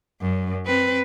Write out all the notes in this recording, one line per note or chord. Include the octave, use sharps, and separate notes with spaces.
F#2
C4 B4